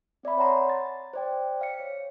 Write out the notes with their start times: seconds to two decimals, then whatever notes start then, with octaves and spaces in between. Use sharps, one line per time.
0.23 C4 D5 E5 B5
0.38 C#5 F#5 A5 A#5 C6
0.70 A6
1.14 C5 D5 G5
1.61 F5 C#7
1.80 C#5